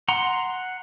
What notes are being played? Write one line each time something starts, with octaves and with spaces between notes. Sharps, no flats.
F#5 A#5 C6